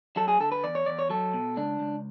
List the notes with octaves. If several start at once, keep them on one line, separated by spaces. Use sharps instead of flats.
F#3 A4
G#4
D3 A4
B4
E2 D5
C#5
E2 D5
C#5
F#3 A4
B2
C#2 D4
C#2